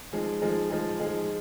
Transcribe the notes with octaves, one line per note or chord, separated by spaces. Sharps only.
F3 G#3 D#4 G#4
F3 G#3 D#4 G#4
F3 G#3 D#4 G#4
F3 G#3 D#4 G#4